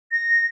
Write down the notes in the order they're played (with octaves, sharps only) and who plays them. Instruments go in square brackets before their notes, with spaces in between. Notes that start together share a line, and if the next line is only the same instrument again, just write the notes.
[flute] A#6